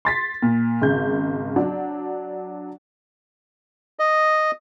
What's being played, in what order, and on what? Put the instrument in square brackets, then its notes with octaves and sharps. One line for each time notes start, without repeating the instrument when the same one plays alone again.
[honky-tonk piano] C6 A6 B6
A#2
G#1 C#3 G6
F#3 D4
[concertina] D#5